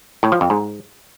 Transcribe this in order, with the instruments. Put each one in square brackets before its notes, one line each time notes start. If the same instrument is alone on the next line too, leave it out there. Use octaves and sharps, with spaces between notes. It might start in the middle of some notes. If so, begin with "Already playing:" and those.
[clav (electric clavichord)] A2
F3
F2
G#2